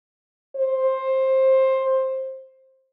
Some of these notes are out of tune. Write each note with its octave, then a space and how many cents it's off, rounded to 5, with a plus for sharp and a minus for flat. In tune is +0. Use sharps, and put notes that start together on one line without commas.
C5 +15